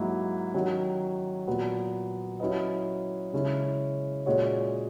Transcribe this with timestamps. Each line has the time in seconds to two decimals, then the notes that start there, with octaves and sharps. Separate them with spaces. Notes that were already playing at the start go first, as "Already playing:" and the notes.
Already playing: G#2 F#3 A#3 E4
0.54 D#3 F#3 C#4
1.47 A#2 F#3 B3
2.40 F#3 C#4 E4 B4 D#5
3.33 C#3 G#3 C#4 E4
4.26 A#2 G#3 C#4 F#4 C#5